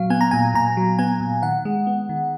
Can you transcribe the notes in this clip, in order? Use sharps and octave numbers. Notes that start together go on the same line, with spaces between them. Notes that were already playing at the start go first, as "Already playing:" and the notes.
Already playing: A#2 F#3 F5
B3 G#5
A#5
A#2 G#5
A#2 A#5
F#3
B3 G#5
A#2
D#3 F#5
G#3
B3
D#3